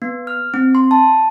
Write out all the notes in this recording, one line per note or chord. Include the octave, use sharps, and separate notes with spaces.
B3
F6
C4
C6
A5